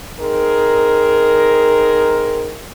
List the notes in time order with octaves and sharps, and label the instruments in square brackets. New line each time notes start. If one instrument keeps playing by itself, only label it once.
[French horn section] C4 D#4 G#4 A#4